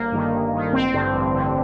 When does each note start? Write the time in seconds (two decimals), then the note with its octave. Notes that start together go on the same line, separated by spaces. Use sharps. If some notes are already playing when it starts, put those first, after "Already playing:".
Already playing: G1 A#3
0.12 G2 D#3
0.32 G1
0.52 G2 D#3
0.72 A1 C4
0.93 G2 D3
1.13 A1
1.34 G2 D3